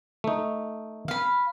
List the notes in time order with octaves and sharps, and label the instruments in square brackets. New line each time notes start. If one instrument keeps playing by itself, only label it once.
[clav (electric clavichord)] A3 D#4
[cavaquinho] F5 B5